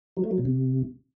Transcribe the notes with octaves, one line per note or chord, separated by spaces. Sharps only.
F#3
A3
F#3
B2
C3